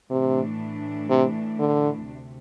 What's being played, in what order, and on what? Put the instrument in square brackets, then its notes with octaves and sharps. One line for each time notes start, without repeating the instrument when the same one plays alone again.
[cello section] A2 E3 A3 D4 [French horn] C3
[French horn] C3
D3
[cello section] D2 C3 A3